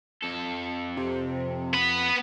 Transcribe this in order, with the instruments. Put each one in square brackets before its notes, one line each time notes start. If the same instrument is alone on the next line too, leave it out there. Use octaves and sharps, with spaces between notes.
[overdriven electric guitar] F2 A4
[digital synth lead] C3
[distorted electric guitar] B3 B5